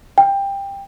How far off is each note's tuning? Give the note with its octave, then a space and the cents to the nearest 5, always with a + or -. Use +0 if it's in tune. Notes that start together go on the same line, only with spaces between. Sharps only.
G5 +15